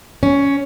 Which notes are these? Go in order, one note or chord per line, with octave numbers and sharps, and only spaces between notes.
C#4